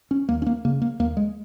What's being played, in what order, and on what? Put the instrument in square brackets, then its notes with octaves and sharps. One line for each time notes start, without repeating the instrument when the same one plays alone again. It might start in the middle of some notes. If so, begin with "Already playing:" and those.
[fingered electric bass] C#4
D#2 A#3
C#4
A#3
C#3 A#3
A#3
D#2 A#3
G#3